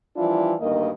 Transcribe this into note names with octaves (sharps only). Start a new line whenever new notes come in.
E3 F3 G3 D4 E4 F4
D2 G2 D#3 A#3 D#5